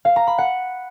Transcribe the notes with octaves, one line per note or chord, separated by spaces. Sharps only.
F5
A#5
B5
F#5